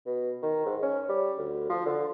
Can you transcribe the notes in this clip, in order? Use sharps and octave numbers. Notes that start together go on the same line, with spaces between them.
B2
D#3
G#2
C#4
G3
D2
F3
D3